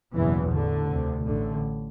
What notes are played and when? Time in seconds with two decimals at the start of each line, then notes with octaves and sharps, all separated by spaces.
0.14 F#1 E2 B2 E3
0.52 A1 A2 D3
0.90 D2 C3
1.27 A1 A2 D3